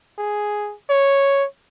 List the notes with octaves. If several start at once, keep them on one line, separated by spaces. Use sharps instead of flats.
G#4
C#5